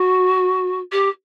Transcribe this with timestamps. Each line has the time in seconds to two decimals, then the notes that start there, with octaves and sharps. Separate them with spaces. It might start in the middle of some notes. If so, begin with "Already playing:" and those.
Already playing: F#4
0.92 G4